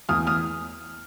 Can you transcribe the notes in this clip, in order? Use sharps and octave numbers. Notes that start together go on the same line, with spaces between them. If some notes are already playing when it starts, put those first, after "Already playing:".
E2 D#6 F6
D#6 F6